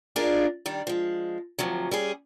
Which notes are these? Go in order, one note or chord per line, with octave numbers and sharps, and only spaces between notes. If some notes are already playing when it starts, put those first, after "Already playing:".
D4 D#4 F4 G#4 A#4
D#3 G3 D4
F3 G#3
D2 C3 F3 F#3
G3 C#4 G#4